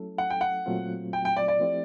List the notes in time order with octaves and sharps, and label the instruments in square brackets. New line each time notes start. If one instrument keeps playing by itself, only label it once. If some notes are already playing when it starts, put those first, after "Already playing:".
Already playing: [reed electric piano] F#3 A3 C#4 E4 A4
[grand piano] F#5
G5
F#5
[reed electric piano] A#2 F#3 A3 C4 F4
[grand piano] G5
G5
D5
D5
[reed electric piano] F3 A3 C4 E4 G4